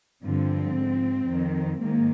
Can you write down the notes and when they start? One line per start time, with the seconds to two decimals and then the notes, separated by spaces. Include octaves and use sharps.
0.23 G2 D3 F3 C4
0.75 G#2 F3
1.27 F2 D#3
1.79 G#2 D#3 A#3